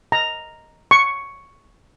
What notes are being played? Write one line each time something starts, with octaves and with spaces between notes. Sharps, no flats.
A#5
C#6